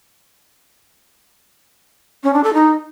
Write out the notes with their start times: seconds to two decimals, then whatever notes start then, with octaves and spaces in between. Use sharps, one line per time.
2.23 C#4
2.33 D4
2.44 A4
2.54 D#4